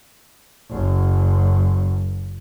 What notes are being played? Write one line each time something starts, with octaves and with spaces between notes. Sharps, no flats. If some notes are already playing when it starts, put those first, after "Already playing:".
F#1 F#2